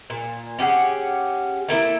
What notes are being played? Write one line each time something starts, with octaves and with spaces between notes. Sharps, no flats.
A#2
C#4 G4 G#4 F#5
A3 A#3 C4 E4